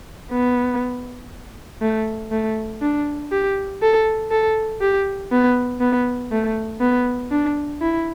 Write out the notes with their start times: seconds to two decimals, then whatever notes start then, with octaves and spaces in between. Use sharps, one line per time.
0.32 B3
1.81 A3
2.32 A3
2.82 D4
3.32 G4
3.82 A4
4.31 A4
4.81 G4
5.32 B3
5.81 B3
6.32 A3
6.81 B3
7.32 D4
7.81 E4